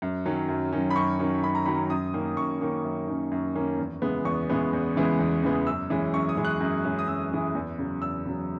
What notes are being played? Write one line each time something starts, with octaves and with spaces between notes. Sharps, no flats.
F#2
D#3 F#3 C#4
F#2
D#3 F#3 C#4
B5
F#2 C#6
D#3 F#3 C#4
F#2 B5
A#5
D#3 F#3 C#4 B5
F#2 D#6
D#3 A#3 C#4
F#2 C#6
D#3 A#3 C#4
F#2
D#3 A#3 C#4
F#2
D#3 A#3 C#4
E2
C#3 E3 G#3 B3
E2 C#6
C#3 E3 G#3 B3
E2
C#3 E3 G#3 B3
E2
C#3 E3 G#3 B3
F#2 E6
E3 G#3 C#4
F#2 C#6
D#6
E3 G#3 C#4
F#6
F#2
E3 G#3 C#4
D#6
F#2 E6
E3 G#3 C#4
E2
C#3 F#3
E2 E6
C#3 F#3